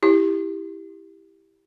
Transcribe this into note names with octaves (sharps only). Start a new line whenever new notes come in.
E4 G4